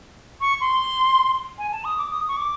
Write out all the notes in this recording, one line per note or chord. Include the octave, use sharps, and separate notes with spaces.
C#6
C6
G#5
A5
D#6
D6
D#6
C#6
D6